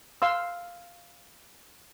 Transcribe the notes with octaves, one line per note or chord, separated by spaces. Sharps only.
F5 C6 E6